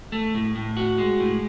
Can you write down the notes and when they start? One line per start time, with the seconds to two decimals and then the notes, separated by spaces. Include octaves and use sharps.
0.12 A3
0.35 A2
0.55 A2
0.77 F#4
0.98 G#3
1.20 A2